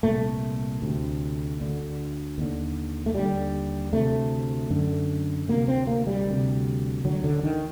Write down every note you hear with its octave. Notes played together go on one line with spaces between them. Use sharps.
C2 A#2 A3
D2 C3
D2 D3
D#2 D3
A3
D#2 D3 G3
D2 C3 A3
F#2 D3
D2 C3 A#3
C4
A#3
G3
D2 C3
D2 D3 F#3
D3
D#3